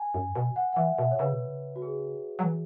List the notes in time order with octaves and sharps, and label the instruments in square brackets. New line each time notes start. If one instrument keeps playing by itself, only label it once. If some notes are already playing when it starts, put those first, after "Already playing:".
Already playing: [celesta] G#5
[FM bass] F#2
B2
[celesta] F#5
F#5
[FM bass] E3 [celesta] E5
[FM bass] B2 [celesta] E5
[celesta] C#5
[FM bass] C#3 [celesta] B4
[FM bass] B2
C#3
[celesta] F#4
G#4
[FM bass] F#3
E3